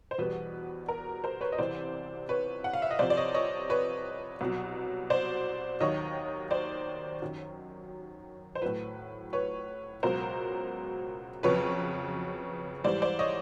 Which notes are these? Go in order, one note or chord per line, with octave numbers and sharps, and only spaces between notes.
C5
E2 B2 G3 B4
A#4
A#4 C5
B4 C#5
D#5
C2 C3 E3 C5 D5
B4 C#5
F#5
F5
E5
D#5
C2 C3 F3 C5 D5
D5
C#5 D#5
C#5 D#5
B4 C#5
C2 B2 F#3
C5 D5
D#2 D#3 F#3 C#5 D#5
C5 D5
F#2 D#3 F#3
C5
A2 F#3 B4
B4 C#5
C#2 B2 F#3 A#4 C5
F2 C#3 F#3 B4 C#5
G#2 E3 G3 C5 D5
C5 D5
C#5 D#5